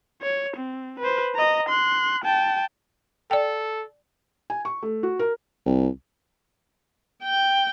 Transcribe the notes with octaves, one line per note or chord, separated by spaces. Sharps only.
C#5
C4
B4 C5
D#5 A#5
C6 F#6
G5 A5
A4 D5 G5
G#5
C#6
A3
F#4
A#4
C2
G5